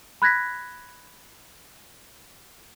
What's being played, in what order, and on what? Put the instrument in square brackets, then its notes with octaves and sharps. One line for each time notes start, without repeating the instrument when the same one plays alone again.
[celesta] B5 F#6 G#6 A#6 B6